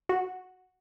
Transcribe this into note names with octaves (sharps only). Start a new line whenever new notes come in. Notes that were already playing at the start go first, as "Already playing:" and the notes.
F#4